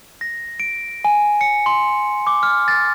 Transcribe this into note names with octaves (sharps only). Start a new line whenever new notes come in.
A#6
D7
G#5
C#7
C6
D6
F6
A6